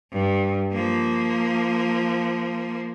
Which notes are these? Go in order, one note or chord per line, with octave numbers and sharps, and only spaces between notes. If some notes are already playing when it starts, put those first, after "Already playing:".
G2
F3 A#3